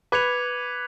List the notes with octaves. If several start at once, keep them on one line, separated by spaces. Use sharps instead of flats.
B4 D6 G#6 C#7 F7